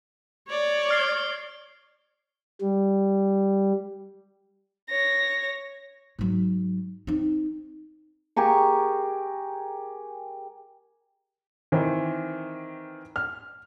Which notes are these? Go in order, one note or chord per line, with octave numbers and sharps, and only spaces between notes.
C#5 D5
F6 C7
G3
C#5 A#6
G#2 F#3
C4 D#4
G4 G#4 A#4 C#6
D#3 E3 C4
F6